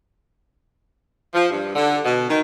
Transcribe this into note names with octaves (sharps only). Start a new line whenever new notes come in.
F3
G2
D3
B2
D#3